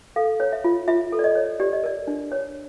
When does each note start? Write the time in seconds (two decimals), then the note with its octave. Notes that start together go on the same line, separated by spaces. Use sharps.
0.16 A4 F5
0.40 C#5
0.52 E5
0.64 F4
0.88 F4 E5
1.12 A4
1.19 D5
1.24 D#5
1.35 C#5
1.60 G4 D5
1.73 D#5
1.84 A#4 D5
2.08 D4
2.32 C#5